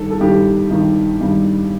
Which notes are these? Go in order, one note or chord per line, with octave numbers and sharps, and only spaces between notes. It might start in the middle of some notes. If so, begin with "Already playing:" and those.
Already playing: G2 D#3 A4
A4
G2 D#3 G4
G2 D#3
G2 D#3